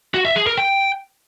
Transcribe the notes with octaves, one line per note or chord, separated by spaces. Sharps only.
F#4
E5
G#4
A#4
G5